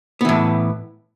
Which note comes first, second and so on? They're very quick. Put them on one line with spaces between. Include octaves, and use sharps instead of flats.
B3 E3 A2